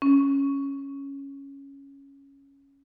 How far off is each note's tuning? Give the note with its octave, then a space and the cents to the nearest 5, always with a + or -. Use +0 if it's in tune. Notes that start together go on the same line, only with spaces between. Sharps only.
C#4 +0